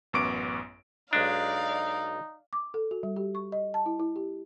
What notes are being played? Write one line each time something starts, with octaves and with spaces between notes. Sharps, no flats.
A1 F#2 B3 C#6 D6 D7
B1 G#3 D4 D#4 D5 F5
D6
A4
F#4
G3
G4
C#6
D#5
A5
E4
E4
G4